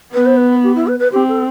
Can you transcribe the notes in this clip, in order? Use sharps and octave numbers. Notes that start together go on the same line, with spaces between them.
B3 B4
C5
B4
G4
E4
B4
B4
C4 G4
A4